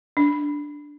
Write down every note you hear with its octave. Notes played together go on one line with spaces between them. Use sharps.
D4